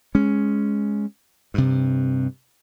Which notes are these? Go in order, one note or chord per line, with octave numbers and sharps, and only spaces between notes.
G#3 C#4
G2 C3